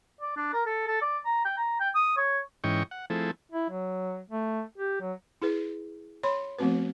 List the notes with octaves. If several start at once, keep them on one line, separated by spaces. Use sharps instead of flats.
D5
D4
A#4
A4
A4
D5
A#5
G5
A#5
G5
D#6
C#5
G#2 E3 C#4 D#5 G5 C#6
F#5
F3 A3 C4 E4 G#4 A4
E4
F#3
A3
G4
F#3
E4 G#4 B4
C#5 B5 C6
F3 A3 B3 C4 F#4 B4